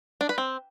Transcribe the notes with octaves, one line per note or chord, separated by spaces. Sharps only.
D4
B4
C4